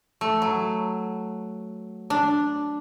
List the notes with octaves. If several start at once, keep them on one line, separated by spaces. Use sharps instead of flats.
A3
F#3
D4